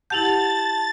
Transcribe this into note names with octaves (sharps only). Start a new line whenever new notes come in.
E4 G4 F#5 A5 G6 A6 F7 F#7